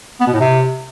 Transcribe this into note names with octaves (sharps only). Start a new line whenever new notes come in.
B3
B2
A2
C3